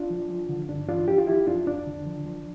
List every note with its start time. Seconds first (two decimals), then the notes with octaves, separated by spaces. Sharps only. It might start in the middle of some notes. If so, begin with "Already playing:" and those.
Already playing: D4 F4
0.10 F3
0.30 F3
0.49 D3
0.69 G2 D4
0.88 E3 D4 F4
1.07 F3 G4
1.18 F4
1.27 F3 E4 G4
1.47 F2 D4 F4
1.66 F2 D4
1.87 D3
2.06 F3
2.26 F3